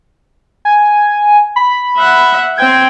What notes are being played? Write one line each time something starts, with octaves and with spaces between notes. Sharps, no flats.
G#5
B5
E5 F#5
C4 G5 G#6